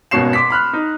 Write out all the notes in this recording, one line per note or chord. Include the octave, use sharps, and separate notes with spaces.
G#1 B2 C#4 C#6 C7 E7
C6 D6 B6
B5 F6 F#6
D#4